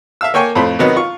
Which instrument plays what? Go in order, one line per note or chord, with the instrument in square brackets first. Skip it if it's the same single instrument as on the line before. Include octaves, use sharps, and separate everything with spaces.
[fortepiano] E5 F5 E6
A#3 C#5 G5 G#5 C#6
F2 A2 A3 C5 B5
C3 D#3 F#3 B3 D#4
F4 C#6